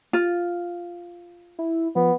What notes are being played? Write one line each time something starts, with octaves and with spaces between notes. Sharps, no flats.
F4
E4
F3 B3